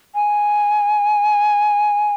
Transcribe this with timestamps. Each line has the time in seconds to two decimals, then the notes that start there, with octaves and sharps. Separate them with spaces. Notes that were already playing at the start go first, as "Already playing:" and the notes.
0.15 G#5